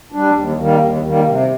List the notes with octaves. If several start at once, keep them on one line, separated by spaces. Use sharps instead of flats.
G3 D4
D#2
D#3 G3 A#3
D#2
D#3 G3 A#3
C3